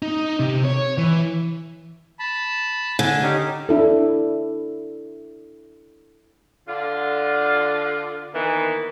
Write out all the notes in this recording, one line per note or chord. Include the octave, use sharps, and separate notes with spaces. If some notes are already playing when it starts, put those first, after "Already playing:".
D#4
C3
C#5
E3
A5 B5
D3 G#5
C#4 D#4 G4
D4 E4 A4
D3 F4
A#2 D#3 E3 B3